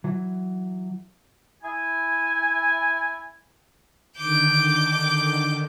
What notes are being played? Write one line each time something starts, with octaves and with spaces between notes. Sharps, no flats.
E3 F#3
E4 G#5
D3 D#3 D6 G6